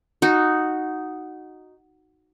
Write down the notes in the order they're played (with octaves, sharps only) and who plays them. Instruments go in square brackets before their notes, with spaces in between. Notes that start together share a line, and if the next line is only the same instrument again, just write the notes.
[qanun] D#4 F#4